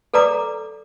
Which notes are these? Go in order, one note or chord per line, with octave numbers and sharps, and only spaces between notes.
A4 B4 D5 A#5 D6